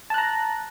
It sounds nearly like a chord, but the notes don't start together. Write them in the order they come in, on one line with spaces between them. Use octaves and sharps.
A5 F#6 A#5